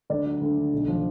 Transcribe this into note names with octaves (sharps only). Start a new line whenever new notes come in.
D2 D5
F#3
D2
D3
B1
F3